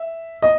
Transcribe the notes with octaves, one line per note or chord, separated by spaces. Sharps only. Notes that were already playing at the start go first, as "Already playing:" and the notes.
Already playing: E5
D#5